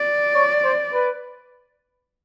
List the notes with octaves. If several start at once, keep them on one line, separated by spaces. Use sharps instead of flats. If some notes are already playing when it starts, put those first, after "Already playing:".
Already playing: D5
C#5
C5
B4